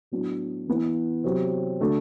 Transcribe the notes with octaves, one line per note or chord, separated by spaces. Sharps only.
A2 F#3 B3 D4 F#4
E3 B3 E4 B4
C3 F#3 C4 G4
D3 A3 D4 F#4 A4